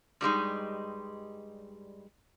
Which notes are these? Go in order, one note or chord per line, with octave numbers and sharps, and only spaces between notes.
G2 G3 G#3 D#4